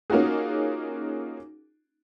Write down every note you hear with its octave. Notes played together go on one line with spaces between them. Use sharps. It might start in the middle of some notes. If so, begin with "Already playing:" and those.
A#3 C#4 D#4 F4 F#4 G#4